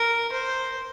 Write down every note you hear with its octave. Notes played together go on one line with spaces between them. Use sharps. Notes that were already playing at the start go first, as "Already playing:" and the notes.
Already playing: A#4
C5